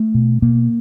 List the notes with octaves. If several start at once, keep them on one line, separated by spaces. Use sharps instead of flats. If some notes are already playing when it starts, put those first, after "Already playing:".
Already playing: A3
B2
B2 A#3